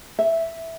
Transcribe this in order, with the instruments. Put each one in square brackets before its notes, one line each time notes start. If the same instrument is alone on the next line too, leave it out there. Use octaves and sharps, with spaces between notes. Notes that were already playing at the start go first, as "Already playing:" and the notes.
[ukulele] E5